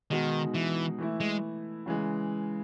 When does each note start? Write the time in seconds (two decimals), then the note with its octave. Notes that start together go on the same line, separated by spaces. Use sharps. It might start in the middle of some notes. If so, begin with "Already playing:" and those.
0.11 B2 D#3 G#3 D#4 F#4
0.54 E3
0.98 E3 A3 E4
1.20 G#3
1.86 C#3 E3 G#3